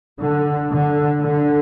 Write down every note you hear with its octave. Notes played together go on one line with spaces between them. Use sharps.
D3
D3
D3